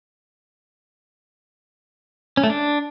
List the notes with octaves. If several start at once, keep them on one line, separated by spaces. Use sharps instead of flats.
C#4
A3
D4